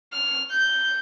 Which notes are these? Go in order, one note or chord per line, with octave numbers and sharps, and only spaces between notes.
F6
G6